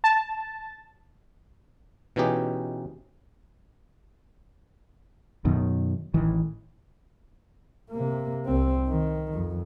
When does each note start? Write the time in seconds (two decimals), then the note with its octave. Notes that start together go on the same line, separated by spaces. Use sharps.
0.04 A5
2.16 B2 E3 C#4 D#4 G4 G#4
5.45 F#2 B2 D#3
6.14 A1 D#3 E3
7.91 C3 A#3
8.46 C2 C4
8.88 D#3
9.34 F2